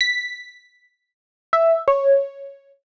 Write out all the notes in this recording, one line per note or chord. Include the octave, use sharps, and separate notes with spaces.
B6
E5
C#5